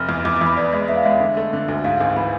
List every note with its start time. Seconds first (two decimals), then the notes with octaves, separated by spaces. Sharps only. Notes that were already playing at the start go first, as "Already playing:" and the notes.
Already playing: F1 F6
0.09 E2
0.25 E2 D6
0.36 D6
0.41 E2
0.47 B5
0.57 B3 D5
0.73 G#3
0.88 B3 E5
0.95 F5
1.03 G#3 E5
1.20 D3
1.37 A3
1.53 D3
1.68 D2
1.84 G#2 F5
2.01 G#1 G#5
2.17 E3 B5